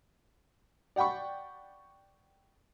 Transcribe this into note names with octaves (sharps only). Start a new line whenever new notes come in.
D5 F#5 G5 B5 C#6